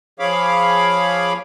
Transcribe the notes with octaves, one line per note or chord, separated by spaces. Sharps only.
F3 G#4 C#5 F5 B5 D6